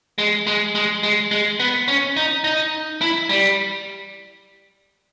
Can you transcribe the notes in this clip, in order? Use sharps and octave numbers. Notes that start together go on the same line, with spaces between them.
G#3
G#3
G#3
G#3
G#3
B3
C#4
D#4
D#4
E4
G3